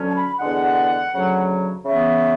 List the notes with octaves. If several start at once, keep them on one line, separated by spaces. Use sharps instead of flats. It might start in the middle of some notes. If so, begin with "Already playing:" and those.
Already playing: D2 D3 F#3 C#4
A5
B5
E2 D3 G#3 D4 F#5
D2 C#3 F#3
C#3 E3 B3 E5